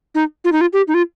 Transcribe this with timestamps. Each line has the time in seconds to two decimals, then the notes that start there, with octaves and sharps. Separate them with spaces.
0.15 D#4
0.44 F4
0.52 D#4
0.61 F4
0.73 G4
0.88 D#4
0.94 F4